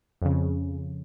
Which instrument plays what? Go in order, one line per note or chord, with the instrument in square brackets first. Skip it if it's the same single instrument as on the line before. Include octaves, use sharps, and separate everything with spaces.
[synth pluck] F2 C#3